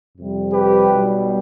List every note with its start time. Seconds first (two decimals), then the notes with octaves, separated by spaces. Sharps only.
0.17 F2 C3 G3
0.52 G4 B4
0.89 B1 B2 G3